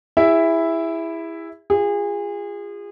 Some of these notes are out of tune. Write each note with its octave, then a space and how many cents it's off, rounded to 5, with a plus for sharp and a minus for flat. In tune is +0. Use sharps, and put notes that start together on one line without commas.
E4 +0 G#4 -40 E5 +0
F4 +0 G#4 -30